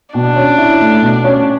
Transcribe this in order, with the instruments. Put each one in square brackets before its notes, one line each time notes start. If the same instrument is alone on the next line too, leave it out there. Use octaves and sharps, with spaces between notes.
[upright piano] B2 [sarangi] D4
[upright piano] C#4
E4
A3
B2
C#4